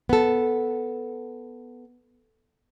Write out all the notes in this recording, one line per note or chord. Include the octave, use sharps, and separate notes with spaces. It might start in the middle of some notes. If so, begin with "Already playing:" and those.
B3 A4